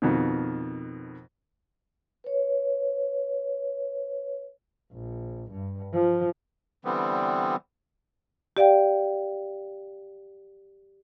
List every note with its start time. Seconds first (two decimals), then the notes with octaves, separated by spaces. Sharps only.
0.02 F2 B2 D#3
2.24 B4 C#5
4.92 A#1
5.51 G2
5.93 F3
6.85 D3 E3 G3 B3 C4
8.57 G4 D5 F5 G5